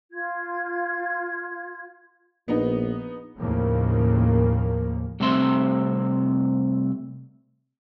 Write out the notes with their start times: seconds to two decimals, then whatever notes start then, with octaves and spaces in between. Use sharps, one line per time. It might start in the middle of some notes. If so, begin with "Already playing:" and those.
0.12 F4 G#6
2.48 A#1 B3 D#4
3.39 D#2 A2 C#3 F3 A#3
5.20 C2 C3 A3 C4 E5 C6